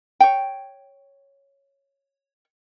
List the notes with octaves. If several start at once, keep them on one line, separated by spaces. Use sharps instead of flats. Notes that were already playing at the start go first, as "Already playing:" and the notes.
C#5 G5